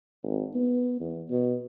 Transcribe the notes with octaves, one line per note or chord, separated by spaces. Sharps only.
G#1
B3
E2
B2